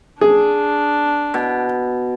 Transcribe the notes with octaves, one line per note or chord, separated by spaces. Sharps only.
D4 G#4
B2